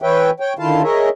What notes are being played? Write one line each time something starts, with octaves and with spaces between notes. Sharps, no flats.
E3 B4 C#5 E5 G5
C#5 G5
D3 D#3 E4 F4 F5 A5
G#4 A#4 C#5 D#5 E5